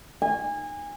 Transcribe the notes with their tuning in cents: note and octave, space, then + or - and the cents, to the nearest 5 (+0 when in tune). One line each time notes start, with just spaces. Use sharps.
G#5 -25